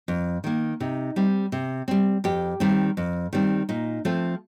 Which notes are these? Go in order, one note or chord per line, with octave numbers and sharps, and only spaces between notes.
F2
D#3 A#3
C3 D#4
G3 C4
C3
G3 C4
F2 G4
D#3 G3 C4
F2
D#3 G3 C4
A#2 D#4
F3 A3 C4